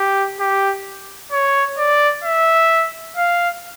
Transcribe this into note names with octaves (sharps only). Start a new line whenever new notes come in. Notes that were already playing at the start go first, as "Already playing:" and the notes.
Already playing: G4
G4
C#5
D5
E5
F5